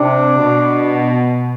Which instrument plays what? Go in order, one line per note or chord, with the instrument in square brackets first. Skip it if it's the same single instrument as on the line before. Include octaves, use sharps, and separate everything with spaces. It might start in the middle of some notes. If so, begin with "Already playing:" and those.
Already playing: [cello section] C3 [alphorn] D4
[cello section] B2